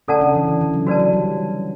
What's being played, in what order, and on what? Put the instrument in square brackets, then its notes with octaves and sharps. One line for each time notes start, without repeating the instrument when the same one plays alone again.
[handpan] C#3 C#4 [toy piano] A4 D5 F#5 A5
[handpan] D3 D4
E3
C#3
D3
F#3
[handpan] F#3 [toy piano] F#4 B4 D5 A5
[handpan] F#3
G3